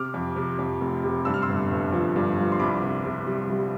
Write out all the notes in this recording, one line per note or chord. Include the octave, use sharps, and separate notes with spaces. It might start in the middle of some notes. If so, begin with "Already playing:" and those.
Already playing: C3 D6 F6
F2
C3
F2
F1
C3
G2 E6
F6
C6 E6
G1
G1
F3
G2
F3
C6
C2 B5 D6
C3
C3
G3
G3